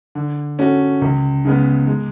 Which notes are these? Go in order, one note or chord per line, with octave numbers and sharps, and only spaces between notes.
D3
A3 C#4 F#4
C#2
C#3 G#3 B3
G#3